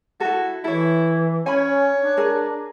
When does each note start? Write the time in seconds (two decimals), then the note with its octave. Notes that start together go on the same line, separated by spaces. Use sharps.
0.20 E4 F#4 A4
0.64 E3 E4 A4 C#5
1.46 C#4 C#5 G#5 B5
1.99 D4
2.17 G#4 A#4 G#5